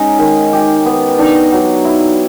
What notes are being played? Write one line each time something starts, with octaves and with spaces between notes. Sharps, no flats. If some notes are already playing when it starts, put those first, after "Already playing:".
Already playing: G#3 C#4 D#4
D#3
G4
B3
D4 D#4
F#3
E4